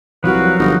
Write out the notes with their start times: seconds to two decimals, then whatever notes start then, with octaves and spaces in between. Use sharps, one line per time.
0.24 C2 F3 F#3 F#4 A#4 B4 F5
0.59 G1 D#4